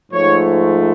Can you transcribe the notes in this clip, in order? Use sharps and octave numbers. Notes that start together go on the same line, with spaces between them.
G#2 F3 A3 C#5